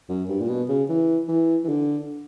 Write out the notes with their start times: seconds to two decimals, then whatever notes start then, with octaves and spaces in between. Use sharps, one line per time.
0.09 F#2
0.29 G2
0.40 A#2
0.49 B2
0.69 C#3
0.89 E3
1.28 E3
1.64 E3
1.69 D3